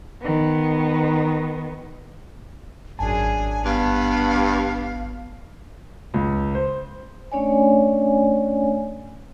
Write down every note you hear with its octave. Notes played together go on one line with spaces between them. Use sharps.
D#3 B3
G#1 F#2 D4 G#4 G#5 A5
G2 B3 F5
C#2
C5
A3 C#4 D4 C#5 D5 G#5